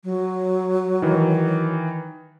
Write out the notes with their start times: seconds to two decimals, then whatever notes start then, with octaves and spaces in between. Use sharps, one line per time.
0.04 F#3
1.02 D#3 E3